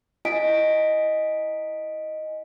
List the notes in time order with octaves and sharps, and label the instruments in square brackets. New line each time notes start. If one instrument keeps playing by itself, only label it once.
[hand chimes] E4 D#5 G#5 B6 D7